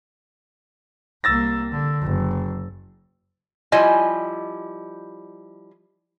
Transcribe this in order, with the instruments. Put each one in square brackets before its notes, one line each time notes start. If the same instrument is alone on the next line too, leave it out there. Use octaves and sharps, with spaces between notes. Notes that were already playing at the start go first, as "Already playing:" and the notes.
[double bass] C2 A#3 [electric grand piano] E6 A6 A#6
[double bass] D3
F#1
[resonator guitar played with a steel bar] F3 G3 E4 D#5 G#5